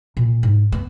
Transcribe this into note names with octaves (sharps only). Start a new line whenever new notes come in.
A#2
G#2
B3